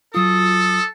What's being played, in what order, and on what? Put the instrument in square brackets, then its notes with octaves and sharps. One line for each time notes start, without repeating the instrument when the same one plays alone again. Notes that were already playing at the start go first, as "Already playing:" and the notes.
[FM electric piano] F#3 F4 [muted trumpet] A4 [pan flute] D#6